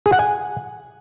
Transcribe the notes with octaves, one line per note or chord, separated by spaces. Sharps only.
G#4
F#5
G#5